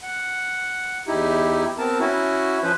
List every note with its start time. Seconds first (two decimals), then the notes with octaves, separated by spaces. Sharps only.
0.03 F#5
1.07 E2 D#4 E4 G4
1.78 B3 C4 A#4 A5
2.00 C#4 E4 F#4
2.63 F3 C#4 B4 C5